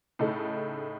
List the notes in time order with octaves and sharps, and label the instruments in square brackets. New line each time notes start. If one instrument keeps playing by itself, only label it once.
[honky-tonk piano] A2 C#3 D#4 A4